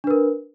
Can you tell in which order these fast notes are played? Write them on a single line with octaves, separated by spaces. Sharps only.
D4 B4 A#4